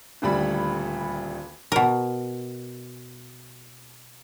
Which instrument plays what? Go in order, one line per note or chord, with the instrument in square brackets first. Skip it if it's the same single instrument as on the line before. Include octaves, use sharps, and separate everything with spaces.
[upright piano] D#1 D2 G3 B5
[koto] B2 A#4